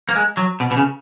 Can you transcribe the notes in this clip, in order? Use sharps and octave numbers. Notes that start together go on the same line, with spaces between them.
A#3
G#3
F#3
B2
B2
C#3